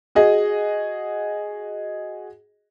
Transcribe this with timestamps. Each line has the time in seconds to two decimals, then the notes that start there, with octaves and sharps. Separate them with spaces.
0.15 F#4 G#4 D#5